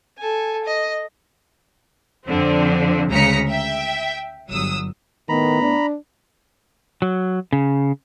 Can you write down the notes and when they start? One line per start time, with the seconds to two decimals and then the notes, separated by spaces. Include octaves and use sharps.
0.18 A4 G#5
0.65 D#5
2.27 F2 D3 F3 C4
3.10 D2 C#3 G#3 A#5 B6 C#7
3.49 E5 G5
4.49 G1 F#3 D#6 E6
5.29 A2 D#3 A3 B3 A#5 B5
5.62 D4
7.02 F#3
7.53 C#3